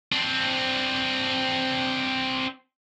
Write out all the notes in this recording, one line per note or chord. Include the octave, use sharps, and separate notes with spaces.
C4 D4